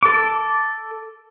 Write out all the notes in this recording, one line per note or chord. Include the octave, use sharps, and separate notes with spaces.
A4 D6